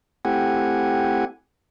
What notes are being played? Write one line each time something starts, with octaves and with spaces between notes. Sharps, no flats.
A3 C4 E4 G4 F#5 G#5